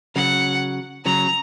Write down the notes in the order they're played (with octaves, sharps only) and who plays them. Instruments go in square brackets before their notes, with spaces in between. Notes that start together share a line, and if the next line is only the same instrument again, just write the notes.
[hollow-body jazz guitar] C#3 F#3 [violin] F#5
[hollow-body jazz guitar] C#3 F#3 [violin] A#5